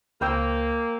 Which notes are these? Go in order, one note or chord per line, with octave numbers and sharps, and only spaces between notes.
C#2 A#3 C5 G5 E6